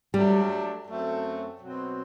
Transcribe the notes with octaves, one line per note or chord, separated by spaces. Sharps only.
F#3 G3 A3 D4 G4
F#2 F#3 A3 C4
B2 F#3 C4